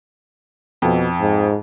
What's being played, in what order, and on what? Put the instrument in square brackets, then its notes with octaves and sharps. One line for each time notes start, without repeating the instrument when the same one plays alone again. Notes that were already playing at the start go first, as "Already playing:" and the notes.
[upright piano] F2 [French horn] B2
[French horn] G#2